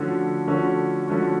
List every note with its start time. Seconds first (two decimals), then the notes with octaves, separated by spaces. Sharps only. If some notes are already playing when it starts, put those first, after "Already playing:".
Already playing: D3 F3 A3 C#4 F#4
0.47 D3 F3 A3 C#4 F#4
1.08 D3 F3 A3 C#4 F#4